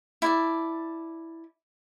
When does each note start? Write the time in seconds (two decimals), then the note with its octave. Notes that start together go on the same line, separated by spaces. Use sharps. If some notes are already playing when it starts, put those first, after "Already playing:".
0.22 E4 D5 A5